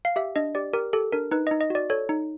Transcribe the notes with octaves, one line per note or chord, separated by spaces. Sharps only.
F5
G4 E5
D4 D#5
G4 D5
G4 A#4
G4 A4
D4 A#4
D#4 B4
D#5
D#4
D#5
F#4 D5
A4 C#5
D#4